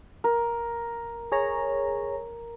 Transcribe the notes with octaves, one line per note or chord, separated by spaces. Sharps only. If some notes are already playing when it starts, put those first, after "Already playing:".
A#4
G#4 C#5 A#5